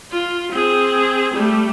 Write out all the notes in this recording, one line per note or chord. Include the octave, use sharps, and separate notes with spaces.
F4
C4 G#4
G3 A3